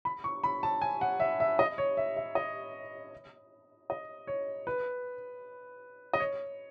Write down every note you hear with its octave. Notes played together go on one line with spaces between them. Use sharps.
B5
C#6
B5
A5
G#5
F#5
E5
E5
D#5
C#5
E5
E5
D#5
D#5
C#5
B4
D#5
C#5